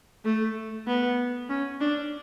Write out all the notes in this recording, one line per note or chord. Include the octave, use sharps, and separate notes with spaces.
A3
B3
C#4
D4